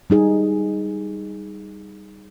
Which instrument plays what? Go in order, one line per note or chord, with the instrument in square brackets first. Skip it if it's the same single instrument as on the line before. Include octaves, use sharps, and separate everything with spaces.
[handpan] G3 D#4 G#4